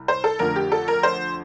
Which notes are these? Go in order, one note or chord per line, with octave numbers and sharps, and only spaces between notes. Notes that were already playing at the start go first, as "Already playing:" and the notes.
Already playing: C2
C5
A4
F2 D3 A3 A#4
G4
A4
A#4
C5